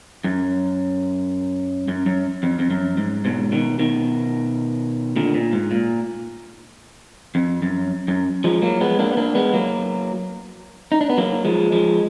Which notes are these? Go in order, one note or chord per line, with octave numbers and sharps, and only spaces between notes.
F#2
F#2
F#2
F2
F2
F#2
G#2
G#2 B2
B2 D#3
B2 D#3
A#2 D3
A#2
G#2
A#2
F2
F#2
F#2
F3 G#3
F#3 A#3
G#3 B3
A#3 D4
B3
A#3 D4
G#3 B3
F#3 A#3
D#4
D4
B3
F#3 A#3
F3 G#3
F3 G#3